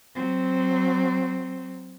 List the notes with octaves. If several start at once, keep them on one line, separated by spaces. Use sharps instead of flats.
F#3 C4